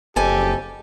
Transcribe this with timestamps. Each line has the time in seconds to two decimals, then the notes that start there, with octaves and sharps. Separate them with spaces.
0.16 F#1 F2 G4 A4 G#5